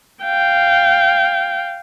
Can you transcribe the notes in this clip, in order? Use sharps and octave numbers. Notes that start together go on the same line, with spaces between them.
F5 G5